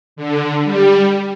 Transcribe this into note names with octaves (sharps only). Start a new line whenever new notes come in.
D3
G3